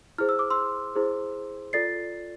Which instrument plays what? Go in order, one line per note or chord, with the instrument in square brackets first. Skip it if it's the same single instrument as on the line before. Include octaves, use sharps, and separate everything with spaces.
[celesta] E4 G#4 C5 F6
E6
D6
C6 E6
E4 G#4 C5
F4 A4 D5 A6 C7